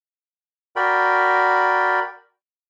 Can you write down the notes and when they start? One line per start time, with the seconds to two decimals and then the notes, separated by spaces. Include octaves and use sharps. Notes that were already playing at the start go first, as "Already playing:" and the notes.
0.76 F#4 A#4 D5 G5 B5